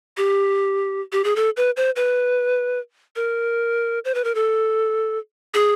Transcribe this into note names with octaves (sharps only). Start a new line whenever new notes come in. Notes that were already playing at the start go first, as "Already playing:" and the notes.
G4
G4
G#4
A4
B4
C5
B4
A#4
C5
B4
A#4
A4
G#4